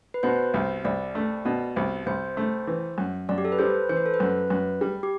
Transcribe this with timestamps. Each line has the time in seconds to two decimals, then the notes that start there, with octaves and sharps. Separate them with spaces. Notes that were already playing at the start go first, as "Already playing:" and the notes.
0.14 B4
0.23 B2 C5
0.54 C2
0.84 C2 D5
1.15 A3
1.45 B2
1.76 C2
2.06 C2 C5
2.37 A3
2.67 E3
2.98 F#2
3.29 F#2 D5
3.38 G4
3.45 A4
3.52 B4
3.59 G3 C5
3.89 E3 C5
3.97 B4
4.06 A4
4.14 B4
4.20 F#2
4.50 F#2
4.81 G3
5.03 G4